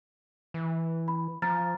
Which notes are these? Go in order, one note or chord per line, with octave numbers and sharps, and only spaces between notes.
E3
B5
F3 A#5 F6 A6